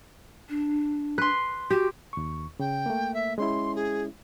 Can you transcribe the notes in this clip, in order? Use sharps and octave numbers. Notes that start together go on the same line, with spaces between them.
D4
B4 C6 F#6
F#4 G4
D#2 C#6
C#3 G5
A3 A#3
E5
G#3 C#4 E4 C6
G#4